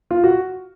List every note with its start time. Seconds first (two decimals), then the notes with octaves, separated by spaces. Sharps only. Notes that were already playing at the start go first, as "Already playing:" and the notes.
0.11 F4
0.24 F#4